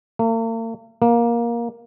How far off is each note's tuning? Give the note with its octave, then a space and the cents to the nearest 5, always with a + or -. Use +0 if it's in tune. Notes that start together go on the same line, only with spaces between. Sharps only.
A#3 -45
A#3 +15